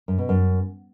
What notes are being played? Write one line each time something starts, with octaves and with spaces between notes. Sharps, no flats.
F#2
B2
F#2